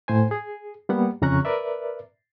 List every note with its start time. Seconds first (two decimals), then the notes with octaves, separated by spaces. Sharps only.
0.08 A2 C5 G#5
0.31 G#4
0.89 G3 A#3 B3 F#5
1.22 F2 C#3 C#4 A#5 C#6 F#6
1.45 A#4 B4 D5 E5